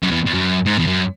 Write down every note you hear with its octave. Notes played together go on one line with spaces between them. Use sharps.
F#2
E2
E2
F#2
G#2
E2
F#2